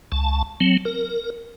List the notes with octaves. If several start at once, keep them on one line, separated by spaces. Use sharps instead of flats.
C#2 A5
F#3 C4
A#4